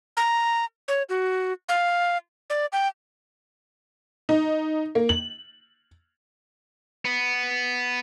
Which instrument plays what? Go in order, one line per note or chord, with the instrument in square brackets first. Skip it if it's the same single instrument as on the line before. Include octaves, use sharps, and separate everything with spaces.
[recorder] A#5
C#5
F#4
F5
D5
G5
[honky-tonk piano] D#4
A#3
F#7
[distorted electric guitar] B3